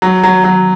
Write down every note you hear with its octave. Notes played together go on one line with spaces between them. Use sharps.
F#3
F#3
F#3